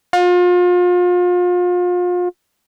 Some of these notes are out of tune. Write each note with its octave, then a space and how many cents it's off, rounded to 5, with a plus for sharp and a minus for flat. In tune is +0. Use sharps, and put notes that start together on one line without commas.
F4 +35